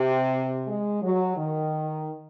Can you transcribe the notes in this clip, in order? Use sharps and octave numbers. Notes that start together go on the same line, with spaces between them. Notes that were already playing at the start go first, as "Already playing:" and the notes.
Already playing: C3
G#3
F#3
D#3